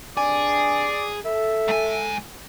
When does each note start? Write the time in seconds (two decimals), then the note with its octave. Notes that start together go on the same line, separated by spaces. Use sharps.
0.17 G2 C3 D4 G#4 D5
1.25 A4 E5
1.68 G#2 G#5